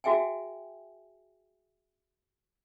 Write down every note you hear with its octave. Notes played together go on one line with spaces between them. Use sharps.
F#4 G#4 E5 G5 G#5